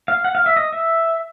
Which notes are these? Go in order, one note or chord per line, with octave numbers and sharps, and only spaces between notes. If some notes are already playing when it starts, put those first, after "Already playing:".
F5
F#5
F5
E5
D#5
E5